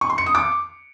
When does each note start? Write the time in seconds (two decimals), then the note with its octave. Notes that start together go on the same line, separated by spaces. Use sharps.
0.01 C#6
0.10 C6
0.18 C#7
0.26 D#6
0.35 D6